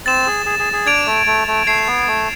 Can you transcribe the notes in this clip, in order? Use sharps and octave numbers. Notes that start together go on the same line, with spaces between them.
C4 A6 E7
G#4
G#4
G#4
G#4
D4 G#6 D7 F7
A3
A3
A3
A3 G#6 C7 E7
B3
A3